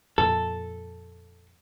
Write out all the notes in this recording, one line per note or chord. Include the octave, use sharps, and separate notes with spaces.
F2 A#2 A4